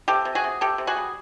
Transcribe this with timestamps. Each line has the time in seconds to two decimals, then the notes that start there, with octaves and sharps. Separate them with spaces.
0.08 C3 G4 A4
0.25 C3
0.35 F#4 G#4
0.44 C3
0.61 C3 G4 A4
0.78 C3
0.87 F#4 G#4
0.97 G3